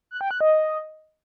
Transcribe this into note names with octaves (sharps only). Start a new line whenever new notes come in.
F#6
G5
F#6
D#5